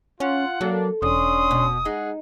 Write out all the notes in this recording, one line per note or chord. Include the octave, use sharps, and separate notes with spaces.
C#4 F4 F#5
F#3 A#3 D4 A4
E1 C#4 D4 C6 D#6
B2
G#3 D#4 G#4 F#5